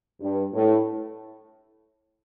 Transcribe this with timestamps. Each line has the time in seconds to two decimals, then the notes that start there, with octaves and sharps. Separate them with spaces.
0.21 G2
0.53 A2